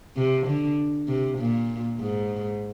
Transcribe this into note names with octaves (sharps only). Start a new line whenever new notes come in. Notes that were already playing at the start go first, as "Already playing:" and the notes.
C3
D3
C3
A#2
G#2